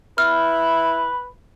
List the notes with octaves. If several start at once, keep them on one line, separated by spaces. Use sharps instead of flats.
E4 B4 F6